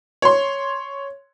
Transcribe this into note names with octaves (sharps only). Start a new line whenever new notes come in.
C#5 C6